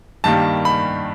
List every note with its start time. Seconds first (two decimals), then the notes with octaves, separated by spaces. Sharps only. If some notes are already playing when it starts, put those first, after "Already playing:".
0.24 G2 D#3 G3 A#3 A5
0.65 B5